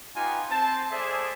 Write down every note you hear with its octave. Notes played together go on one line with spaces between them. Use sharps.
B3 D#4 F4 G4 G#5
C4 A5
G#3 G#4 A4 C5 D5 E5